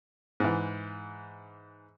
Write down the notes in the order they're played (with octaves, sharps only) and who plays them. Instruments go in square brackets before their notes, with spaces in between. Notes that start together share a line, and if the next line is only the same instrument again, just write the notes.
[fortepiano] G#2 E3